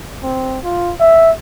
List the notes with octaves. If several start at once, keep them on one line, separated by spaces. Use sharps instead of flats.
C4
F4
E5